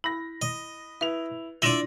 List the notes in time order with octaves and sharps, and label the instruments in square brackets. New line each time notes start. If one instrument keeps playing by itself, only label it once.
[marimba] E4 [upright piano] B5 A#6
[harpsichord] D#5
[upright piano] E4 F7 [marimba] B4
[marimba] D4 E4 F4 [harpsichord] D5 E5 [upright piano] C6 A#6 D#7